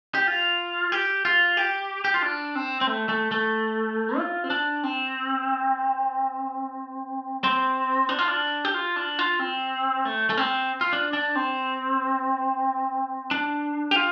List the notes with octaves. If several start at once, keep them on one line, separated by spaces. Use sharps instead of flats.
G4
F4
G4
F4
G4
G4
F4
D4
C4
C4
A3
A3
A3
F4
C4
D4
C4
C4
D4
F4
D4
G4
F4
D4
F4
C4
A3
A3
C4
F4
D4
D4
C4
D4
G4
F4